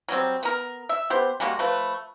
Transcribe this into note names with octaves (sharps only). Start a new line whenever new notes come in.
F#3 G3 C4
B3 A#4
E5
B3 G4 C5
G3 G#3 A#3 F#4
F3 A3 B4